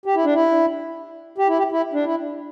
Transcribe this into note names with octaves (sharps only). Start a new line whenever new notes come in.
G4
E4
D4
E4
G4
E4
G4
E4
D4
E4